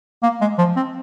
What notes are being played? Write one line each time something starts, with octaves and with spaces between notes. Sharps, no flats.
A#3
G#3
F3
C4